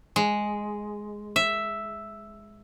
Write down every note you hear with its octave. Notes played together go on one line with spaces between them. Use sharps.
G#3
E5